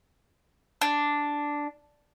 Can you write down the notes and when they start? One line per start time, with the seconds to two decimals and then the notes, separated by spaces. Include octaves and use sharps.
0.81 D4